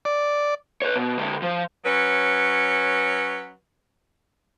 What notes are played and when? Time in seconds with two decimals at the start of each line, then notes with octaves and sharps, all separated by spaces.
0.05 D5
0.82 B4 C#5
0.96 B2
1.19 D3 G#3
1.42 F3
1.85 F#3 C#4 B4